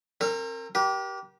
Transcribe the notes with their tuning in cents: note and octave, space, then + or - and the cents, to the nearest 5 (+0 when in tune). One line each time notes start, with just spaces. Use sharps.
C4 +35 A#4 -25
G4 -20 A#4 +40